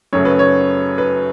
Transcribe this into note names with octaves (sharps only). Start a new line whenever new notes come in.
F#2 C#3 F#3 A3 C#5
B4
C#5
B4